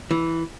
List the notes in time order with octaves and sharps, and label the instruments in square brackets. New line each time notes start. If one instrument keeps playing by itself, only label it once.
[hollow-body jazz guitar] E3